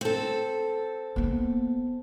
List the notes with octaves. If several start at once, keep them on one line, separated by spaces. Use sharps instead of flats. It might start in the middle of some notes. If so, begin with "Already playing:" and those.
C4 A4
A#3 B3